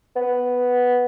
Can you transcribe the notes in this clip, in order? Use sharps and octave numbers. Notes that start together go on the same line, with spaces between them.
B3